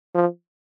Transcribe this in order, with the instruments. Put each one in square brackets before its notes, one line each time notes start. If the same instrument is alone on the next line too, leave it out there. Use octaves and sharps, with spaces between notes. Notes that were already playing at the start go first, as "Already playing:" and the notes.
[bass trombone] F3